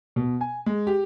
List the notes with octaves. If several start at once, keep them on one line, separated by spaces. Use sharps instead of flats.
B2
G#5
G#3
G4